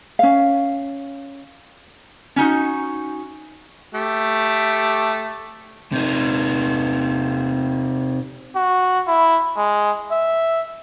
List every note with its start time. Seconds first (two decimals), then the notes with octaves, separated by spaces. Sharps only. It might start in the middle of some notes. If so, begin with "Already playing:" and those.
0.19 C#4 F5
2.36 C#4 D#4 F#4
3.94 A3 G4
5.92 C3 D#4
8.56 F#4
9.08 E4
9.57 G#3
10.12 E5